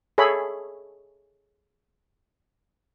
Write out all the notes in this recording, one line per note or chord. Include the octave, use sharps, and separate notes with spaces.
G#4 A4 C#5 E5 B5